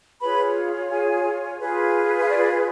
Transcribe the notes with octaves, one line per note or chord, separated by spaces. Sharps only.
F4 G#4 B4 C#5 B5
G#4 G#5
F4 G#4 B4
F5
D5